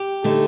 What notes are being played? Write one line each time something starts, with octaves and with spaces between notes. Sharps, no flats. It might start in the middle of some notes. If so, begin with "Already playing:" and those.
Already playing: G4
D3 A3 D#4